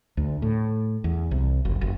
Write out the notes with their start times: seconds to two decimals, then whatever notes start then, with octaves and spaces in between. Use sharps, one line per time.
0.17 D2
0.42 A2
1.04 E2
1.31 C2
1.65 F#1
1.81 F#1